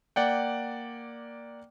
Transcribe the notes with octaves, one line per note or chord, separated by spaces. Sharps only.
A#3 D5 F#5 G5